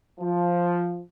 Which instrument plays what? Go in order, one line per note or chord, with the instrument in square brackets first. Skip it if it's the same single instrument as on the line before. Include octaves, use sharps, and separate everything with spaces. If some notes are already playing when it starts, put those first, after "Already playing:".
[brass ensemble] F3